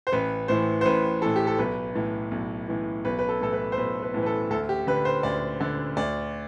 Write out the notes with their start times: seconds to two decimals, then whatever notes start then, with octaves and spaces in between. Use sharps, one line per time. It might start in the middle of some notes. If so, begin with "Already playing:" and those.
0.07 C5
0.12 A1 B4
0.48 A2 E3 C5
0.81 C5
0.85 A1 B4
1.22 A2 E3 A4
1.36 G4
1.47 A4
1.58 B1 B4
1.95 A2 E3
2.31 B1
2.68 A2 E3
3.05 B1 B4
3.19 B4
3.29 A4
3.41 A2 E3 A4
3.53 B4
3.72 C5
3.77 B1 B4
4.02 B4
4.14 A2 E3
4.23 B4
4.26 A4
4.50 D2 A4
4.69 G4
4.87 D3 B4
5.05 C5
5.23 D2 D5
5.60 D3 D5
5.97 D2 D5